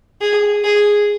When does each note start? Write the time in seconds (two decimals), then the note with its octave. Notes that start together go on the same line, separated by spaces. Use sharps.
0.21 G#4
0.64 G#4